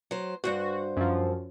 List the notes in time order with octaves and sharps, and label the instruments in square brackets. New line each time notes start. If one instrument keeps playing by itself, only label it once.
[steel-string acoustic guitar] F#3 C5
[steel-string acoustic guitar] G2 B2 C5 [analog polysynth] F#4
[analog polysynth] F#2 F3